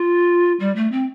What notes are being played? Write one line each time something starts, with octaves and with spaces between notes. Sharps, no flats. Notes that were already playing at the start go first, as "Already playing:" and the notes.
Already playing: F4
G3
A3
C4